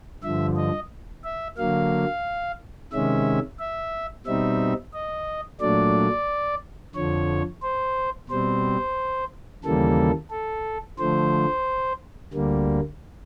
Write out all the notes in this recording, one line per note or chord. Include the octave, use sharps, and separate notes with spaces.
G2 D3 F3 E5
D#5
E5
D3 F#3 A#3 F5
C3 D#3 G#3 C#4 E5
E5
B2 G3 C4 D#4 E5
D#5
A#2 F#3 A3 D4 D5
F2 D3 F3 C#5
C5
B2 G3 C4 C5
D#2 C#3 E3 G3 A#3 A4
A4
D3 F3 A3 C5
D2 D3 G3 A#3